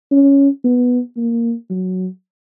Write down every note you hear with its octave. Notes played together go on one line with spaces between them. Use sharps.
C#4
B3
A#3
F#3